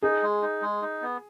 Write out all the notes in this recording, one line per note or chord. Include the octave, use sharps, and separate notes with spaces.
D#4 G#4
G#3
D#4
G#3
D#4
B3